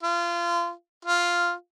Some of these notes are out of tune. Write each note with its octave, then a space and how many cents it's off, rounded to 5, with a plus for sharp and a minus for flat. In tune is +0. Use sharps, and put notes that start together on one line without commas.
F4 -25
F4 +0